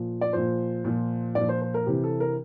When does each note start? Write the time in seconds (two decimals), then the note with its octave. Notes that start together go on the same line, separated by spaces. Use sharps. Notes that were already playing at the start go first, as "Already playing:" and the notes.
Already playing: A#2 F3
0.21 D5
0.33 A#2 F3 C5
0.84 A#2 F3
1.35 A#2 D5
1.41 F3
1.49 C5
1.62 C5
1.74 A#4
1.86 C3 E3 G4
2.04 A4
2.20 A#4